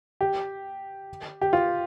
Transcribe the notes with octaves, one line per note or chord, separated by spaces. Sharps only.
G4
G4
F4